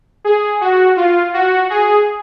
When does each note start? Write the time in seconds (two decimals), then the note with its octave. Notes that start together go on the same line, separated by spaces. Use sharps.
0.24 G#4
0.61 F#4
0.97 F4
1.34 F#4
1.70 G#4